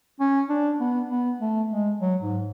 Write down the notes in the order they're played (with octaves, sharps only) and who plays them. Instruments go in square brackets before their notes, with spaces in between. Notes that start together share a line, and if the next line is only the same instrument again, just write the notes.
[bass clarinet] C#4
D4
B3
B3
A3
G#3
F#3
G#2